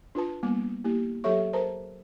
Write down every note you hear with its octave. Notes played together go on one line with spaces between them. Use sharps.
D4 F4 B4 A5
G3 A#3 B3 D6
A#3 E4 G4
F#3 G4 A4 C#5 E5 C#6
A#4 C5 A5 A#5